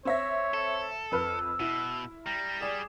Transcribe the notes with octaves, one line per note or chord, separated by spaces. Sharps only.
C4 C#5 E5 A#6
A4
F2 B4 E6 F6
B2 E4
G3 A#5
G#4 D5 E7